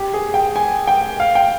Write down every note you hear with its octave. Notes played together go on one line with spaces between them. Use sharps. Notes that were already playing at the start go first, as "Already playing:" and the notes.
Already playing: G4
G#4
G5
G#5
G5
F5
G5